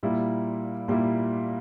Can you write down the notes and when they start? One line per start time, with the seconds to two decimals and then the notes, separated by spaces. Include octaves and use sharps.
0.03 A#2 G3 A#3 E4
0.88 A#2 G3 A#3 E4